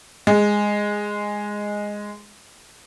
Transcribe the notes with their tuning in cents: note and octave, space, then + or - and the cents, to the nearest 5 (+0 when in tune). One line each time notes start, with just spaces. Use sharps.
G#3 -5